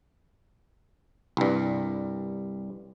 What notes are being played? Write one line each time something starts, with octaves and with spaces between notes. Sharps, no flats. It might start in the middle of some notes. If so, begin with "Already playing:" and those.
C2 G2